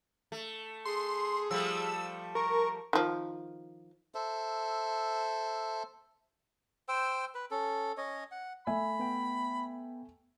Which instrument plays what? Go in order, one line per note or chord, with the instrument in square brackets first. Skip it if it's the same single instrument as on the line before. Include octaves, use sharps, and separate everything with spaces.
[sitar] A3
[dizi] G#4 [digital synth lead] C6
[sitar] F3 G3 A3 [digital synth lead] E6
[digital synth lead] A#4 [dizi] C#6
[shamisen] D#3 F3
[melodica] A4 C5 E5
C5 G5 E6
B4
C#4 A4
C#4 C#5 D#5
F#5
[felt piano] A3 E5 G#5 [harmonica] B5
[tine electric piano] B3 G5